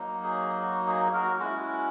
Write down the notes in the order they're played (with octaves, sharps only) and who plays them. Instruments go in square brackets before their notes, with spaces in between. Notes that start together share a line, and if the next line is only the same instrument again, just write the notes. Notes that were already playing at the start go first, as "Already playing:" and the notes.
Already playing: [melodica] F#3 A#3 D#4
G#4
F#4
G#4
F#4 A#4
G#3 C#4 E4 F#4